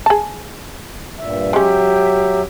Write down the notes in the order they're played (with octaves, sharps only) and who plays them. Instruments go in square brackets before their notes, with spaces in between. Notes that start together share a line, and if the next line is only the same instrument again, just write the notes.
[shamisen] G#4 A5
[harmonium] G2 A#2 E5
[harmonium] F#3 E5 [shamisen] G#3 C#4 [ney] G4